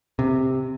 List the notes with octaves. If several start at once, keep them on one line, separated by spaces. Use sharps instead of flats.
C3